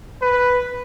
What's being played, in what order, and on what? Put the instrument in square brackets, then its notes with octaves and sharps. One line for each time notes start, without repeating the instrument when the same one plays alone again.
[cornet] B4